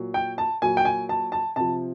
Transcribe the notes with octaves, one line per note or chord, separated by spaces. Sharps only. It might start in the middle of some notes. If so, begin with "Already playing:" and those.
Already playing: A#2 F#3
G5
A5
A#2 F#3 G#5
G5
G#5
A5
A5
C3 F3 A5